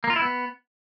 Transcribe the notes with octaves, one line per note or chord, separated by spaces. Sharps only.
A#3
F4
E4
B3